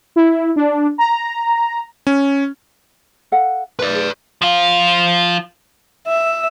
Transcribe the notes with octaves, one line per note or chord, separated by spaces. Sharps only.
E4
D4
A#5
C#4
A4 F5 F#5
A#4 B4 D5 A5
G#4
F3 F4
E5